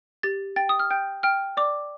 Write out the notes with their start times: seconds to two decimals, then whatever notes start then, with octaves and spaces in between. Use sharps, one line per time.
0.23 G4 A6
0.56 G5 A6
0.69 D#6
0.79 F6
0.91 G5 G6
1.23 G5 F6
1.57 D5 D6